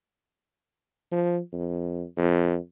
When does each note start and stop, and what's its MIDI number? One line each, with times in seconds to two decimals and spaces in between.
1.11 1.39 53
1.53 2.03 41
2.17 2.57 41